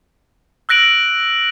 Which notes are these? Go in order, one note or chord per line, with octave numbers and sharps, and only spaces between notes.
E6 F#6 A#6 D7 F#7